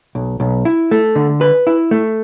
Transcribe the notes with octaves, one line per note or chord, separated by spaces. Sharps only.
B1
B1
E4
A3
D3
B4
E4
A3